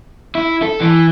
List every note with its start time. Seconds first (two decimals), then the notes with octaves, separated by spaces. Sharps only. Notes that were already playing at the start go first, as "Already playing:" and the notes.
0.35 E4
0.62 A4
0.81 E3